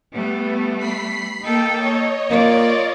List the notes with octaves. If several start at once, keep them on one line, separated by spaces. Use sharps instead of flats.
G3 A3 B3
B5 B6 C7
A#3 D#4 A4 G5
C#5 D#5
A#3 F4 D5